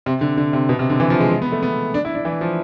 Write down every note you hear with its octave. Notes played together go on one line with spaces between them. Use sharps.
C3
D3
D3
C3
B2
C3
D3
E3
F3
G#3
G#3
B3
A3
B3
D4
E4
D4
E3
F3